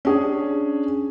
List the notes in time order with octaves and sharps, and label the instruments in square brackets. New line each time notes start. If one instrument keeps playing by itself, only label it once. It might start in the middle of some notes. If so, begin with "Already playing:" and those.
[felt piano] C#4 D4 G#4